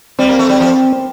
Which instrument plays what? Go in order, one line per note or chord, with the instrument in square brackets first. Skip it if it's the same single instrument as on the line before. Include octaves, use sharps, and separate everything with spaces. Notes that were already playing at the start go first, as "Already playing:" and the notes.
[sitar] G3 [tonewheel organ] C4
[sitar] A#3
A3
G3
F3